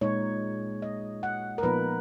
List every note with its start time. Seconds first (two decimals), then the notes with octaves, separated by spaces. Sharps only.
0.01 A#2 G#3 D#4 C#5
0.82 D#5
1.23 F#5
1.58 A#4
1.63 A#2 F3 B3 D#4 B4